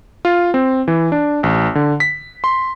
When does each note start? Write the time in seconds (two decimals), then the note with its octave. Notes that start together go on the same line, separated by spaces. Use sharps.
0.25 F4
0.54 C4
0.88 E3
1.12 D4
1.43 A1
1.75 D3
2.00 B6
2.44 C6